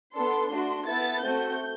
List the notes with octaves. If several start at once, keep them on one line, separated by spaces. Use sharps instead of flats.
B3 D4 A4 C6
A3 D4 F#4
B3 E4 A4 A6
A3 C4 F#4 A4 G6